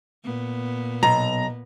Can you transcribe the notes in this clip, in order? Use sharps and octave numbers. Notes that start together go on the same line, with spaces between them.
A#2 B3
B1 A#5